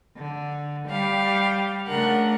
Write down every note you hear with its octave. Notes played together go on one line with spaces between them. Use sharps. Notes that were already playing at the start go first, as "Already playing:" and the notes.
D3
G3 G4 F5
C#3 A3 D4 A#4 F#5